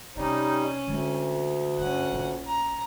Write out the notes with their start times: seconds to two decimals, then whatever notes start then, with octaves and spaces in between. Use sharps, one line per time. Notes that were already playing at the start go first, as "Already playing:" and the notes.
0.16 C3 G3 C#4 D#4
0.87 D2 D3 G#3
1.78 G2 C#4 F#5
2.12 A#1 F4
2.47 A#5